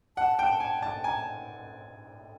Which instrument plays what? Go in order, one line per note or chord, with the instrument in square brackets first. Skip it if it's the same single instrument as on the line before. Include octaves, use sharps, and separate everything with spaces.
[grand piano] F#5 [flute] A5
[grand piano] G5
G#5
A5
[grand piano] G#5 [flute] A#5
[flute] A5